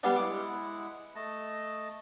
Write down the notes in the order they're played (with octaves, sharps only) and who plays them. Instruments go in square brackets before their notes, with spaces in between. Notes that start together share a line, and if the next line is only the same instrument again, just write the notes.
[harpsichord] G3 B3 D4 [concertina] F5 F#5
[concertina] G#3 E4 F#5 [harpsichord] D6
[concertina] A3 D#5 A5